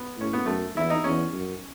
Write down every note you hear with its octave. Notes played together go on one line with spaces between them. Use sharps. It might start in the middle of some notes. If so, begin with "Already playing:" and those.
Already playing: B3
A2 C#4
B3
F#2 A3
E2 E4
D#4
E2 C#4
F#2